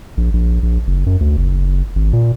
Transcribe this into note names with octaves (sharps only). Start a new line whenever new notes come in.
A#1
A#1
A#1
F#1
F#2
D2
F#1
G#1
A#2